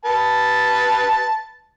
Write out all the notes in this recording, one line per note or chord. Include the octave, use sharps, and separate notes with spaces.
B4 A5